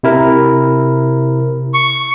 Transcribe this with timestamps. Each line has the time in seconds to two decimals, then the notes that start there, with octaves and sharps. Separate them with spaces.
0.03 C3 E4 A#4
1.74 C#6